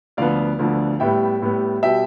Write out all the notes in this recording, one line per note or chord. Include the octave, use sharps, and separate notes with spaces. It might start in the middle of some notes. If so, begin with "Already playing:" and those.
D2 D3 F3 B3 D5 F5
D2 D3 F3 B3
A2 G3 B3 E5 G5
A2 G3 B3
B2 G3 E5 G5